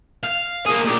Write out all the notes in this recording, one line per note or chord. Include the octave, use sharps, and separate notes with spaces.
F5
A#3 G#4
A#2 G4